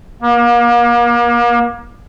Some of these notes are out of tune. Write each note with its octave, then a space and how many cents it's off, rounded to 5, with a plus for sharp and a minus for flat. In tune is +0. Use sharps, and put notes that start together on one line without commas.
A#3 +35